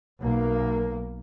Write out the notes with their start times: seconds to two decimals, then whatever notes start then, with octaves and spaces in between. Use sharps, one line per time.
0.19 B1 A#3